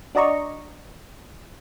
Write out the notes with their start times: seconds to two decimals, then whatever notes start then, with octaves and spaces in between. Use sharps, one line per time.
0.15 D4 F#4 D5 D#5 A#5 C#6